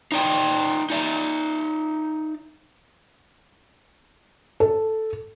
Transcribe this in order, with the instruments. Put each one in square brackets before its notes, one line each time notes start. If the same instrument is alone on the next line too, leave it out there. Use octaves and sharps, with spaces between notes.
[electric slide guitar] D#4 D5 G5
D#4 D5 E5
[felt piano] A4